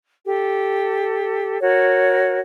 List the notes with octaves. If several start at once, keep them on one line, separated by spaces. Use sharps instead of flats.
G4 A4
F#4 A#4 C#5